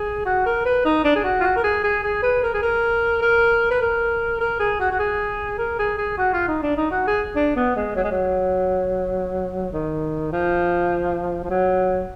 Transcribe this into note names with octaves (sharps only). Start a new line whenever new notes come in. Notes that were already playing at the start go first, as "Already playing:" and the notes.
Already playing: G#4
F#4
A#4
B4
D#4
D4
G#4
F#4
F4
F#4
A#4
G#4
G#4
G#4
B4
A#4
G#4
A#4
A#4
B4
A#4
A#4
G#4
F#4
F#4
G#4
A#4
G#4
G#4
F#4
F4
D#4
D4
D#4
F#4
G#4
D4
B3
G#3
F#3
G#3
F#3
D#3
F3
F3
F#3